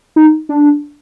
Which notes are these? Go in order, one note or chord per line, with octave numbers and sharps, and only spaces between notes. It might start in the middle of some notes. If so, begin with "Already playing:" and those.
D#4
D4